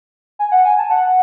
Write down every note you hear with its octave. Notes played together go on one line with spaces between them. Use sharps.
G#5
F#5
G#5
A5
F#5